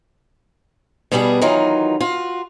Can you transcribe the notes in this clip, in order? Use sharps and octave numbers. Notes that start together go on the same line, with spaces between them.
B2 G3 B3 D4 F#4 G#4
D#3 E3 F#3 D#4 F4
F4 F#4